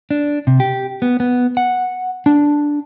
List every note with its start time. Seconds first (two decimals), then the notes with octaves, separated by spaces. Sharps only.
0.11 D4
0.47 C3
0.60 G4
1.02 B3
1.20 B3
1.57 F#5
2.26 D4